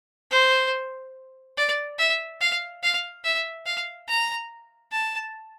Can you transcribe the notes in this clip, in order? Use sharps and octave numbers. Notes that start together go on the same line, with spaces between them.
C5
D5
E5
F5
F5
E5
F5
A#5
A5